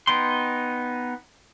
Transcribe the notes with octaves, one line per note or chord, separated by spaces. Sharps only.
B3 D#4 G5 C6